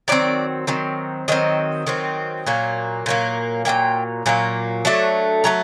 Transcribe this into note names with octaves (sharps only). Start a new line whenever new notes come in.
D#3 F#3 C4 D5
D#3 F#3 C4
D#3 F#3 C4 D#5
D#3 F#3 C4
A#2 F#3 A#3
A#2 F#3 A#3
A#2 F#3 A#3 G5
A#2 F#3 A#3
F#3 A3 D4 A5
F#3 A3 A#5